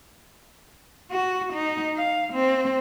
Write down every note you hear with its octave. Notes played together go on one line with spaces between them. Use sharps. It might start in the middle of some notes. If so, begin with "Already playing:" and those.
F#4
D#4
F5
C4